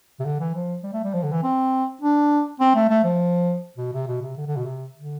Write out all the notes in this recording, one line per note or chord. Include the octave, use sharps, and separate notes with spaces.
C3
D3
E3
F3
G3
A3
G3
F3
D3
E3
C4
D4
C4
A3
A3
F3
B2
C3
B2
C3
D3
D3
B2
C3
D3